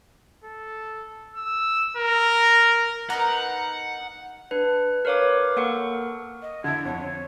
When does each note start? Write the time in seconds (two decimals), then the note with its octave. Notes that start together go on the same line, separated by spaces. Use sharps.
0.44 A4
1.35 E6
1.97 A#4
3.10 B3 D#4 A#4 F#5
4.51 D4 B4
5.05 A#4 B4 C#5 F5 D6
5.57 A#3 A4 A#4 F#5 C#6
6.42 D#5
6.64 D3 E4 G#6
6.85 F2 C#5